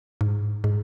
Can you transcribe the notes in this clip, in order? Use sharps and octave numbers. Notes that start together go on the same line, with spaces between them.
G#2
G#2